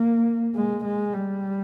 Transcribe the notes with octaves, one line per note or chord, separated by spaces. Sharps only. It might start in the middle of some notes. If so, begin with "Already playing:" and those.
Already playing: A#3
G#3
G#3
G3